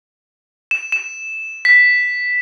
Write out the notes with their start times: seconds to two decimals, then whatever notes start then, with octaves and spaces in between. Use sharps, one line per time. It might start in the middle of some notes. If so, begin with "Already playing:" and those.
0.71 E7
0.92 E7
1.65 B6